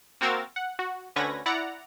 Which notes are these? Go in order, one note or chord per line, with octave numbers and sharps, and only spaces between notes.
A#3 C4 F#4 A#4 E6 A6
F#5
F#4
D2 D3 C#4 B4 G#6 A#6
E4 D5 F#5 A#5